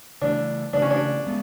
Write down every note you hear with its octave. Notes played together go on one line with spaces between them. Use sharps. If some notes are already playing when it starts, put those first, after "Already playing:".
C#3 E3 A3 D4
C#3 E3 A3 D4
C#4
D4
G#3 B3